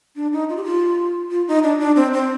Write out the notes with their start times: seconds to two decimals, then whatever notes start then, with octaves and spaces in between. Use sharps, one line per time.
0.16 D4
0.33 D#4
0.49 F4
0.57 G4
0.65 F4
1.31 F4
1.48 D#4
1.63 D4
1.80 D4
1.96 C4
2.13 C4